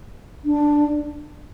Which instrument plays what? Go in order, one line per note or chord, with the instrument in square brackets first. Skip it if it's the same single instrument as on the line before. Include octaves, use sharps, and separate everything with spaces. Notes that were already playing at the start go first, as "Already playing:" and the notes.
[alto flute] D4